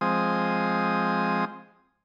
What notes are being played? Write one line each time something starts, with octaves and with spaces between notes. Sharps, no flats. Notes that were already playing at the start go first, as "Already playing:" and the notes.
F3 G#3 C4 D#6